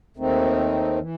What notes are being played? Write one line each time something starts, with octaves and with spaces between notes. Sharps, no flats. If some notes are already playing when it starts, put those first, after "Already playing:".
D#2 D#3 A3 C4 D#4
E3